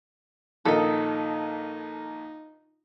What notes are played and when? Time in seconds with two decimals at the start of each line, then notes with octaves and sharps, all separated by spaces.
0.65 A#1 D#3 D#4 A4 D#5